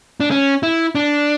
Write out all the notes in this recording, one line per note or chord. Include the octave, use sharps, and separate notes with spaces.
D4
C#4
E4
D4